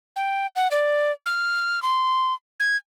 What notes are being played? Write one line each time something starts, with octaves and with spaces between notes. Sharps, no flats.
G5
F#5
D5
F6
C6
G#6